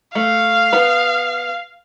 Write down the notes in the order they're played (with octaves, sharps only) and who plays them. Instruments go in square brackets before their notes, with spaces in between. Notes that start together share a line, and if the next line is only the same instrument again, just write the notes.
[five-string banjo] A3 [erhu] F5
[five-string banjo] B3 B4